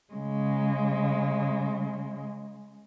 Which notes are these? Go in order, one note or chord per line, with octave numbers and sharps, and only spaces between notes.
C#3 G#3